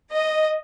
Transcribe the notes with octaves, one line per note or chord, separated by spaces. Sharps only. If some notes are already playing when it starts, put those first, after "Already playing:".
D#5